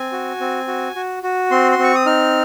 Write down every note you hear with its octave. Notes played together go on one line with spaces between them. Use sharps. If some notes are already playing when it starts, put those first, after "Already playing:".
Already playing: C4 G#5
F#4
C4
F#4
F#4
F#4
C4 C6
C6
C4
C#6
D#6
D#4 F6